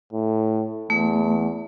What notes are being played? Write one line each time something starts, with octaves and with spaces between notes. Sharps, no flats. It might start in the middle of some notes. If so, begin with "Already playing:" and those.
A2
E2 A3